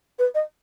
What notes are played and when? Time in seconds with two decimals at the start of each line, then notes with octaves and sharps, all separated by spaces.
0.18 B4
0.34 D#5